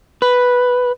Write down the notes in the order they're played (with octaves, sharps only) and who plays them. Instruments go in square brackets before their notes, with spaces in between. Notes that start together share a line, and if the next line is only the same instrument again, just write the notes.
[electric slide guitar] B4